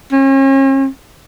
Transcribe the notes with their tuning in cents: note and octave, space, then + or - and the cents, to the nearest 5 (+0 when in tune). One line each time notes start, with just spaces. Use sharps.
C#4 -40